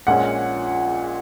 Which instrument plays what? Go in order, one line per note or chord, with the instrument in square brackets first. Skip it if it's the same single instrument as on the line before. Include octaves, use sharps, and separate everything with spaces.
[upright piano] A#1 A#2 G#3 C#4 F#5